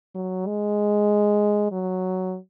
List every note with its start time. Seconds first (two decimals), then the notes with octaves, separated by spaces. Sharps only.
0.15 F#3
0.46 G#3
1.72 F#3